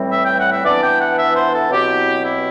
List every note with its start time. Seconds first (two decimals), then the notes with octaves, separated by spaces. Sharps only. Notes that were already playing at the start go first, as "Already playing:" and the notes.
Already playing: A2 E3 G3 C4
0.11 E5
0.24 G5
0.38 F#5
0.51 E5
0.64 E3 B3 D4 D5
0.82 G5
1.00 F#5
1.18 E5
1.36 C5
1.53 A4
1.71 B2 F#3 C4 E4 G4
2.24 E4